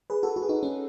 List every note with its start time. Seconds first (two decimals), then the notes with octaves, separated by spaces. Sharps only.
0.10 G#4 B4
0.23 F#4 A4
0.36 F#4 A4
0.43 G#4
0.49 D#4 F#4
0.63 C#4